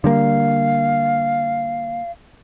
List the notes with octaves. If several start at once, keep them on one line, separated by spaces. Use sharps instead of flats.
D3 G3 A#3 F5